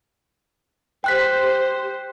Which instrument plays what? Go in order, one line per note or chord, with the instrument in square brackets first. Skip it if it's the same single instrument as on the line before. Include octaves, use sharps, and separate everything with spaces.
[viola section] G4 C5 [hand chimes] G5 F#6 B6